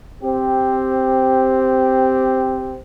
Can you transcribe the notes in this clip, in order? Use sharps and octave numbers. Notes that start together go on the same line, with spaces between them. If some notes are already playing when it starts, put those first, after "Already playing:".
C4 G4